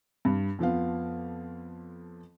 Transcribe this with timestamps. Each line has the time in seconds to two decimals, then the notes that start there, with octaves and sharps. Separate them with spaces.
0.25 G2
0.59 F2 F3 B3 F5